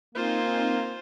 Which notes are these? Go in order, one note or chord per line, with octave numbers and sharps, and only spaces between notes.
A#3 C4 D#4 F4 C5 G#5